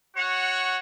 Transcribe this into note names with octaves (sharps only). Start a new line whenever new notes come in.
F#4 C#5 F#5